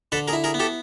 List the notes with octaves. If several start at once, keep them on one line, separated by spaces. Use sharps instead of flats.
D3 A4 B4
G#4 A#4
E4
G#4 A#4
B3
G4 A4